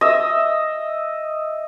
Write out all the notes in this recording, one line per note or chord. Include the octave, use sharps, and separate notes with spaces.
D#5 E5